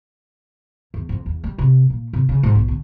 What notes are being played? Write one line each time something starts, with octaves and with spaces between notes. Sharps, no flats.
E2
F2
E2
G3
C3
A#2
C3
C#3
G#2
B1
D3